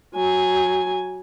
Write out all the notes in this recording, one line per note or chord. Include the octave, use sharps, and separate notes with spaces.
F#3 G#5